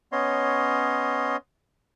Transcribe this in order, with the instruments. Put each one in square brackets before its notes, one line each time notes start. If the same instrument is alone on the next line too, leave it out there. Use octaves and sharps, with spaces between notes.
[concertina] B3 C#4 C#5 D#5 C6